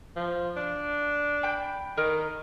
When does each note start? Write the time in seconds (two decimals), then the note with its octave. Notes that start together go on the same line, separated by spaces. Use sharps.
0.16 F3
0.57 D4
1.43 G5 B5 G6
1.97 D#3 A#4